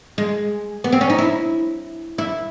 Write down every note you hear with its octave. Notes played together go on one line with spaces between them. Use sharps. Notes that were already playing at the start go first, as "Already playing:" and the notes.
G#3
B3
C4
C#4
D#4
E4
E4